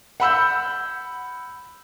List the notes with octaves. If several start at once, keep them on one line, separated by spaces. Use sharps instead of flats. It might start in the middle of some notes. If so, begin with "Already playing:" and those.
F#5 B5 E6 G6